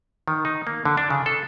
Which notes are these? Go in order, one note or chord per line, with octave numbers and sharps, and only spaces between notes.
D#3
D#4
A#3
D3
D4
C#3
A4